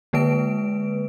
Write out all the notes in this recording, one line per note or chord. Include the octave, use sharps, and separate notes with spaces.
D3 G#3 A#3 B4 D7